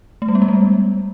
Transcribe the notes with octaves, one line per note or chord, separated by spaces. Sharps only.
A3
G3
B3
G#3
G3